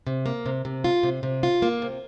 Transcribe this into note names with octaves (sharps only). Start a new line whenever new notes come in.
C3
A#3
C3
C3
F4
C3
C3
F4
A#3
C3